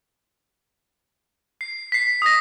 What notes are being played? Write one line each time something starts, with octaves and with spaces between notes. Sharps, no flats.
C7
B6 C7
D#6 A#6